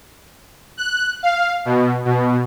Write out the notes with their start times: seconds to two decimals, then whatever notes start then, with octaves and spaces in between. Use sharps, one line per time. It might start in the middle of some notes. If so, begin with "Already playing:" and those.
0.78 F#6
1.23 F5
1.65 B2
2.05 B2